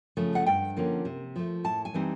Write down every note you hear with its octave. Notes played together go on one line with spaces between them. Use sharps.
C#3 F3 A3
F#5
G2 G5
D3 F3 A#3 C#4
C3
F3 A3
A2 A5
G#5
E3 G3 C4 D#4